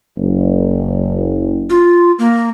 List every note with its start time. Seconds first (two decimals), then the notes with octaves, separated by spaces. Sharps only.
0.17 F#1
1.70 F4
2.19 A#3